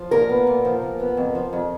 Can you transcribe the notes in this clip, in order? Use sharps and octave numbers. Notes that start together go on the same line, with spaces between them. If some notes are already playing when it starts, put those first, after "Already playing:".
Already playing: F3
A#2 A#4
B3
A#2
F3
A#2
B3
F2
F3
F2